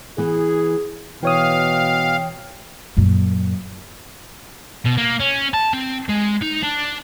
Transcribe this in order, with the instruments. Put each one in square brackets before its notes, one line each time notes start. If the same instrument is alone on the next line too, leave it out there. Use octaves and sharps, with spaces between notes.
[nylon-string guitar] E3 B3 [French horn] G#4
[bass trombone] B2 [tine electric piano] E3 C#5 D#6 [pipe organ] F5 [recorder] G5
[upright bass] F#2 A#2
[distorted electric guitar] B2
A#3
C#4
A5
C4
G#3
D#4
D4